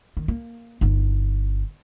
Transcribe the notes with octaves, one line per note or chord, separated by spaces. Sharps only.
D#3
A#3
G1 D#4